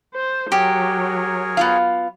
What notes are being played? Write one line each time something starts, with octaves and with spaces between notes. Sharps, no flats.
C5
F#3 G4 G#4 A#4 C#5
B3 F4 F5